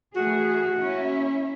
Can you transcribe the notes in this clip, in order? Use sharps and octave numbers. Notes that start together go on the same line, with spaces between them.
E3 A3 F#4 G#4
A#3 C#4 E4